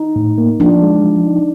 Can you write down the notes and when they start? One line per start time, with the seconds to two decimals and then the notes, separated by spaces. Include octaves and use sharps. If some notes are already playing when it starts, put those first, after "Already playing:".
Already playing: D#4
0.16 A2
0.38 A#3
0.60 F3 D4
0.83 G#3
1.04 F3
1.26 D#4